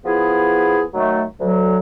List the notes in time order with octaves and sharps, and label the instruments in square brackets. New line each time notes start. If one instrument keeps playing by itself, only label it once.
[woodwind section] F3 B3 E4 G#4
D#3 F#3 A3
D2 F#3